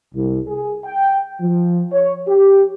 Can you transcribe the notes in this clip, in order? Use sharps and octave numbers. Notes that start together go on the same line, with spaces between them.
C2
G#4
G5
F3
C#5
G4